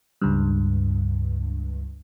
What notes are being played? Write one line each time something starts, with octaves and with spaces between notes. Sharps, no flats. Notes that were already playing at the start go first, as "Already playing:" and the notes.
C#2 G2